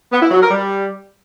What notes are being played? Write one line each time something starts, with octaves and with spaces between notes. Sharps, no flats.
B3
E4
F#3
A#4
G3